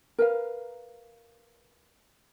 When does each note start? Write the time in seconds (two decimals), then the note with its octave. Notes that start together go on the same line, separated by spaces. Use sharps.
0.19 A#4 B4 F5